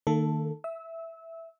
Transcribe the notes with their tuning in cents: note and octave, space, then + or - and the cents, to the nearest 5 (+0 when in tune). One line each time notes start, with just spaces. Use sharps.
D#3 -20 A#3 -35 A4 +0
E5 +0 E6 -30